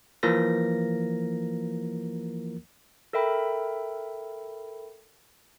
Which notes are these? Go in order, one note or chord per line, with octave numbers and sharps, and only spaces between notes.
E3 F3 A#3 A#4 A#6
A4 A#4 E5 G5 B5